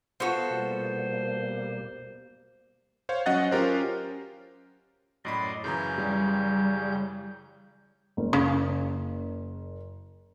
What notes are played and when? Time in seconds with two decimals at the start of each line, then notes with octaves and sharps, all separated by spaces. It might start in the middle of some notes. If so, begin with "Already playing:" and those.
0.20 B3 F4 F#4 A4 C5 F5
0.50 B2 G3 A#3
3.09 C5 C#5 F5
3.26 F#3 C#4 D#5 F#5 F#6 A6
3.51 C#4 F4 G4 A#4 C5
5.25 F#2 A2 D5 D#5 B5 C6
5.64 F#2 C#3 E3 A#5 G6
5.98 G3
8.17 F#1
8.33 C#3 C#4 F5